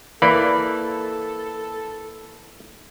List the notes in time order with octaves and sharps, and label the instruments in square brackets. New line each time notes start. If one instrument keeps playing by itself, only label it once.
[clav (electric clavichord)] E3 A#3 D5 [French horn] A4 [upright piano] B5